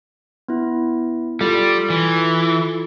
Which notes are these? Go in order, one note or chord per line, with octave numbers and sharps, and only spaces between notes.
B3 E4
G3 F4 A4 A6
E3